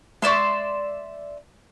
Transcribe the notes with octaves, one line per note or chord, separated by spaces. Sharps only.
G#3 D5 E5 C6 C#6